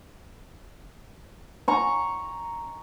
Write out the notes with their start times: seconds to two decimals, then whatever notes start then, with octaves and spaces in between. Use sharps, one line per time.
1.68 A#5 C#6